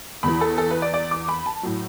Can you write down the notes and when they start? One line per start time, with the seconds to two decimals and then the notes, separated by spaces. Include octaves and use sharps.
0.23 E2 E3 B5
0.41 A4
0.58 A4
0.71 B4
0.82 D5
0.94 D5
1.11 D6
1.28 B5
1.46 A5
1.63 A2 F#3